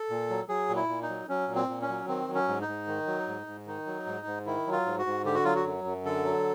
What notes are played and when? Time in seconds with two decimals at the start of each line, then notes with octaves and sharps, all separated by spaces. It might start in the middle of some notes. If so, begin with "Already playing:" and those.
Already playing: A4
0.10 A#2
0.30 F#3
0.49 F#3 G#4
0.69 A#2
0.76 E4
0.88 A#2
1.03 D#4
1.09 F#3
1.28 F#3 C#4
1.48 A#2
1.55 C4
1.69 A#2
1.82 C#4
1.89 F#3
2.08 D#3 C4
2.28 F#3
2.35 C#4
2.48 G#2
2.61 D#4
2.68 G#2
2.87 D#3
3.07 F#3
3.28 G#2
3.47 G#2
3.67 D#3 D#4
3.86 F#3
4.06 G#2
4.26 G#2
4.46 D#3 E4
4.67 F#3
4.72 F4
4.86 G#2
4.98 F#4
5.06 G#2
5.25 D3 G4
5.35 F#4
5.44 F#3 F4
5.55 F#4
5.65 F#2
5.84 F#2
6.05 D3 A4
6.24 F#3